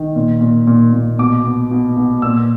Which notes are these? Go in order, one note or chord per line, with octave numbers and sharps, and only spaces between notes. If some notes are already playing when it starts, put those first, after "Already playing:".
Already playing: D#3
A#2
A#2
A#2
A#2
B2 D6
B2
B2
B2
A#2 E6